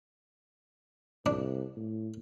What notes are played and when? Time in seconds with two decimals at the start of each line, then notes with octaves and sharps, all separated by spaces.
1.26 C2 D4
1.76 A2